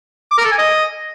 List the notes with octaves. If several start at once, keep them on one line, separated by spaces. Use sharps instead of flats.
D6
A#4
A4
G#5
D#5